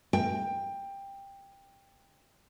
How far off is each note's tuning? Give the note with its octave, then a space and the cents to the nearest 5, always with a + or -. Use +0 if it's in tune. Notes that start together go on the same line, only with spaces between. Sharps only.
G5 +15